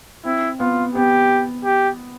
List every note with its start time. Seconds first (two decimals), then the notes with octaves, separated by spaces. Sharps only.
0.25 C4 E4
0.60 B3 F4
0.95 B3 G4
1.65 G4